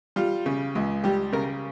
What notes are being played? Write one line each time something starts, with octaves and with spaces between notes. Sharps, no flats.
G3 F4
C#3
C#2
G3 G4
C#3 A#4